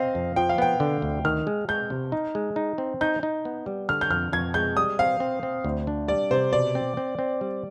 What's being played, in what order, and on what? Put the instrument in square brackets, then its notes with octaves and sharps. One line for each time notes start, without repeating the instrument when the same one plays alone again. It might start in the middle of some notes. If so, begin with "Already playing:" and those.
Already playing: [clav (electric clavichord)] C4 [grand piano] D#5 F5
[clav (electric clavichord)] F2
[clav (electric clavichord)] F3 [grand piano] G5
[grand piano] F5
[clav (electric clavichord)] B3 [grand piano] G5
[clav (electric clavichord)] D3
D2
[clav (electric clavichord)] D#3 [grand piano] F6
[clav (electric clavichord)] G#3
[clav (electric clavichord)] G#3 [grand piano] G6
[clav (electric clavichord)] C3
D#4
G#3
D#4
C4
[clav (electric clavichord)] D#4 [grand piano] G6
[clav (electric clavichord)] D#4
B3
G3
[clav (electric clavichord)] D3 [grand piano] F6
[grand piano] G6
[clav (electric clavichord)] F2 [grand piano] F6
[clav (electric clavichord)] F2 [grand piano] G#6
[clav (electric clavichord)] G#3 [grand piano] G6
[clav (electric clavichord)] G3 [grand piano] D#6
[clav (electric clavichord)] C4 [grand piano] F5
[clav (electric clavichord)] C4
C4
D2
D4
[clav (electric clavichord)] G3 [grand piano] D5
[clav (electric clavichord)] C3 [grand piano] C5
[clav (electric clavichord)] B2 [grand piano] D5
[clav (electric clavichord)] C4
C4
C4
G3